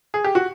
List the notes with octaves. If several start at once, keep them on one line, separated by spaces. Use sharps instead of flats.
G#4
G4
F#4